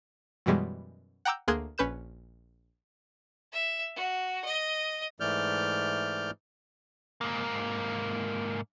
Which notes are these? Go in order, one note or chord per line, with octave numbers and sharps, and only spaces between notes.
F#2 B2 E3 G3 G#3
F#5 G5 A#5 D6 E6 G6
D2 A#3 G#4 C6 F#6 G#6
A#1 C#4 B4 G6 E7
E5
F#4
D#5
G#2 E3 A3 D5 F6 G6
G#2 A#3